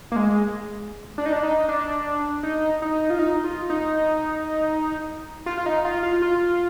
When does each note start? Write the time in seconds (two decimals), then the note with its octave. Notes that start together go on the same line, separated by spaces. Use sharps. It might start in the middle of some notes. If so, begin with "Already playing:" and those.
0.12 A#3
0.16 G#3
1.18 D4
1.26 D#4
1.33 D4
1.43 D#4
1.69 D4
2.43 D#4
2.82 D#4
3.10 F4
3.19 D#4
3.44 F4
3.70 D#4
5.46 F4
5.58 F4
5.66 D#4
5.85 F4
6.03 F4
6.22 F4